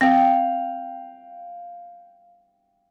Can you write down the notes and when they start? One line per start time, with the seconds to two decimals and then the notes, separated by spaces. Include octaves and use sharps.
0.01 C4 F5 G5